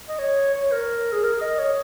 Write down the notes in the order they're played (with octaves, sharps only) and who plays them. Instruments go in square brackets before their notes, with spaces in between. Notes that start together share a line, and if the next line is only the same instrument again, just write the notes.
[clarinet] D#5
C#5
C#5
A#4
G#4
A#4
D#5
C#5